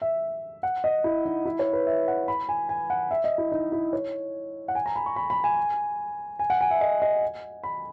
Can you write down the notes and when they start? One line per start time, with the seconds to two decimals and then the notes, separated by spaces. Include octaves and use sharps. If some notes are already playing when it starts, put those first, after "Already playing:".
0.02 E5
0.63 F#5
0.84 D#5
1.04 E4
1.25 D#4
1.45 E4
1.59 C#5
1.73 B4
1.87 E5
2.08 F#5
2.28 B5
2.49 G#5
2.69 G#5
2.90 F#5
3.11 E5
3.24 D#5
3.38 E4
3.52 D#4
3.72 E4
3.93 C#5
4.68 F#5
4.75 G#5
4.86 A#5
4.96 B5
5.06 C#6
5.16 B5
5.30 B5
5.44 G#5
6.39 G#5
6.50 F#5
6.61 G#5
6.71 E5
6.81 D#5
7.02 D#5
7.63 B5